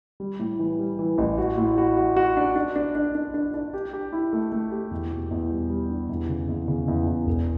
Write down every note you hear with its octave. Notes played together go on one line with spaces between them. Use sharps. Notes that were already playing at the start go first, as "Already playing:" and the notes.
G3
A2
E3
G3
E3
A1
F#4
A2
F#4
F#4
F#4
D4
D4
D4
D4
D4
D4
D4
G4
G4
E4
A3
A3
G4
E2
B2
E2
G3
G3
D4
E2
C#3
E2
C#3
E2
E2
E1